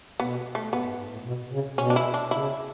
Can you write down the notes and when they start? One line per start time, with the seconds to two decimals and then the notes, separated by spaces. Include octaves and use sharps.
0.20 B2 B3
0.55 A3
0.72 A2 B3
0.86 G#2
0.99 G#2
1.12 A2
1.25 B2
1.52 C#3
1.78 B2 C#4
1.90 D4
1.96 E4
2.14 D4
2.31 C#3 E4